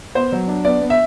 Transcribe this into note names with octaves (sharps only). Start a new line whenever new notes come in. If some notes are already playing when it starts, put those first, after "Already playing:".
B3 C5
F#3
D4
B3 D5
B3
E5